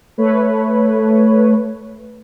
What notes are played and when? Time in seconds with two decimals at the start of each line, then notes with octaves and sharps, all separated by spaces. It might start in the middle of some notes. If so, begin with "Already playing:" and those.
0.18 A3 B4 C#5